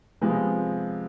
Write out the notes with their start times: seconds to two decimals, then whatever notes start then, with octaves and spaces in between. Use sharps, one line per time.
0.21 C3 F3 G#3 B3